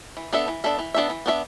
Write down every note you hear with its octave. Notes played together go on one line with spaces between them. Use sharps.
E3
B3 D4 A4 E5
E3
B3 D4 A4 E5
E3
B3 D4 A4 E5
E3
B3 D4 A4 E5